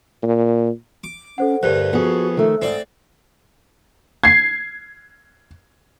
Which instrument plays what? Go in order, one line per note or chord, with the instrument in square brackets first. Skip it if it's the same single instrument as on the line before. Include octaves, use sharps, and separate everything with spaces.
[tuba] A#2
[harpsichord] D6
[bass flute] C#4 [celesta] A4 C5 F#5
[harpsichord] D2 G2 [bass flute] A#4 [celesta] C5 F#6
[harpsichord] F2 [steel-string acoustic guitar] B3 G#4 [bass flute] F#4
[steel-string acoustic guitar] D#3 A3 [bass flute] A4
[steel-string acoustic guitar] D#2 G#2 [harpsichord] C4 D5
[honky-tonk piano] G#6 C7